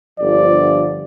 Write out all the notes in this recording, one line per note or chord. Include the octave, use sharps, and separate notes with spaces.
G1 F3 D5